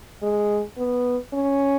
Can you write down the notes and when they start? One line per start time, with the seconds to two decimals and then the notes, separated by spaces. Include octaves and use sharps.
0.22 G#3
0.78 B3
1.34 C#4